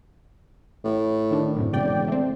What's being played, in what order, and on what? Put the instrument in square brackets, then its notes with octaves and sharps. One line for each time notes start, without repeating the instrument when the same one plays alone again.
[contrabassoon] A2
[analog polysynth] D#3 D4
F#2 A2 C3
[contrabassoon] E1 [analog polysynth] C#3 D5 G5
[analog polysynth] A3 C4